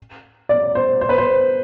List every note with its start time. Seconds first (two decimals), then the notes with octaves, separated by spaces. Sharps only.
0.49 D5
0.75 C5
1.01 C5
1.09 B4
1.18 C5